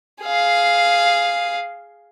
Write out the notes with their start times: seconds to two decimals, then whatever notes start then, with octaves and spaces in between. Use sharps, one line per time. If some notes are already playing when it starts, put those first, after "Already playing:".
0.22 G#4 F5